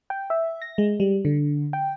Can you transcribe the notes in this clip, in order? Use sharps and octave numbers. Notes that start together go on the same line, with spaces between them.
G5
E5
A#6
G#3
G3
D3
G5